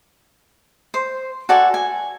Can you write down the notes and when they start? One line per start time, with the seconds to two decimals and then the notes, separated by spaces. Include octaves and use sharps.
0.94 C5
1.49 F#4 A4 D5 G#5
1.74 G#5